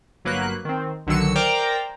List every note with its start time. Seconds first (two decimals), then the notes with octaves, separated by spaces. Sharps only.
0.25 G1 F#3 A#3 B4 F#6
0.65 D#3 C4
1.07 B1 D3 D#3 F#3 E6 C#7
1.36 A#4 C5 D5 G5 A#5 D6